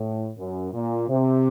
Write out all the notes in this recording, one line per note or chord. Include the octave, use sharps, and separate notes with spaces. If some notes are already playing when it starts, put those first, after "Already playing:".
Already playing: A2
F#2
A#2
C3